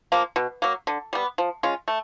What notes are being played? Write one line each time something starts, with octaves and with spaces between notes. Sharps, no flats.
F3 A#3
B2
F#3 A#3
D3
G3 B3
F3
G#3 C#4 F4
A3